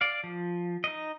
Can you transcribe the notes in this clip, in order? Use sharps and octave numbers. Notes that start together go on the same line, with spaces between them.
D5 F5
F3
D#4 D#5